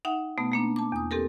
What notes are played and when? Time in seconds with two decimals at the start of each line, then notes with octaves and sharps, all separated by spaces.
0.05 D#4 E5 F#5 G5
0.38 B2 A3 B3
0.52 A3 A#3 D4
0.76 A5 D6
0.92 E2 D#6
1.11 C4 G4 A4 A#4